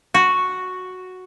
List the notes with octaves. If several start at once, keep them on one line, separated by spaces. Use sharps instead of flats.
F#4